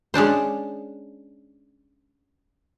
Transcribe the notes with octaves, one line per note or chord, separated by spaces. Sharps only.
G#3 C#4 D4 C5